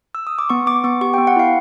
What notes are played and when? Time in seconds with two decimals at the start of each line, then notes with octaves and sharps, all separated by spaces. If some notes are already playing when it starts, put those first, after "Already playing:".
0.15 E6
0.27 D#6
0.39 D6
0.50 B3 C#6
0.67 B3 D6
0.84 B3 C#6
1.01 G4 C#6
1.14 G5
1.18 B3
1.27 F#5
1.36 E4 F5